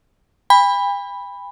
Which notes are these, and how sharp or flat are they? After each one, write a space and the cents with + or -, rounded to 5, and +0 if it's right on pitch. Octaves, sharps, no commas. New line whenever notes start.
G5 +45 B5 +0